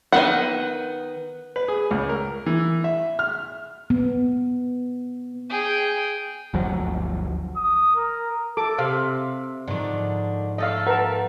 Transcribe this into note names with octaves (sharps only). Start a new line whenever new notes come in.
D#3 B3 F#5
B4
G#4
C#2
A#4
E3
E5
F6
B3
G#4 G5
G1 D2 F3 F#3
D#6
A#4
A4 D6
C3 F5
G#2 D3 D#3 F3
A3 A4 D#5 F5
A#4 B4 F#5 A5